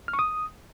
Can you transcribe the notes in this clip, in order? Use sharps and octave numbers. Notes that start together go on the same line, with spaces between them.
F6
C#6
D#6